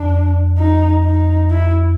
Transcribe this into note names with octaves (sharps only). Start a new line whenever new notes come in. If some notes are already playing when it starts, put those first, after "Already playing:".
Already playing: F2 D4
D#4
D#4
E4